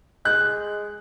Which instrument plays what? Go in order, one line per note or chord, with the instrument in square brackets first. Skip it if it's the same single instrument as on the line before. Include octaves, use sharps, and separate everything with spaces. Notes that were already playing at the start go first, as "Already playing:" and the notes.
[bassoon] G#3 [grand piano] F#6